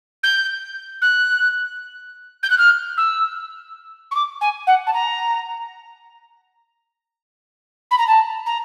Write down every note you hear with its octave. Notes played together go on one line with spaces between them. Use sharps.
G6
F#6
G6
F#6
F6
E6
C#6
D6
G#5
F#5
A5
A#5
B5
A#5
A5
A#5